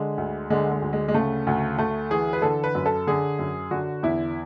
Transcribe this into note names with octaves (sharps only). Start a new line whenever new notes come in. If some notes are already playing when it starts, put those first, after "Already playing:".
Already playing: D3 G#3
D2
D3 G#3
G#3
D2
G#3
G#3
C#3 A3
D2
D2 A3
E3 G#4
B4
D3 A4
B4
F#2
A4
D3 G#4
F#2
D3 F#4
E2 E4